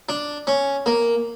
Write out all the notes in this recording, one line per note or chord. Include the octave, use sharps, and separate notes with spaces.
D4
C#4
A#3